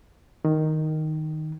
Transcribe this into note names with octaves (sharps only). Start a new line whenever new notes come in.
D#3